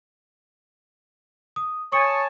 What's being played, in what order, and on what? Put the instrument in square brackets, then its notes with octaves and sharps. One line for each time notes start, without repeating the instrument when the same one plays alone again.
[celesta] D#6
[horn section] C#5 G#5 A5 [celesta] C#6 D#6 C#7